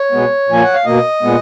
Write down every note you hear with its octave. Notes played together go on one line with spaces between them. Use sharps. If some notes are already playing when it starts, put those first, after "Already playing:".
Already playing: C#5
B2 G#3 B3
A#2 F3 A#3 G#5
F#5
F5
B2 A#3 D#5
A#2 G#3 B3